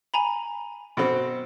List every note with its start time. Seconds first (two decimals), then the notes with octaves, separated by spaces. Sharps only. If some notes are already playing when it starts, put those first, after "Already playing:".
0.14 G#5 A#5 B5
0.97 B2 C4